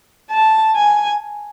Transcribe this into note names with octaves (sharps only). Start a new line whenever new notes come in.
A5
G#5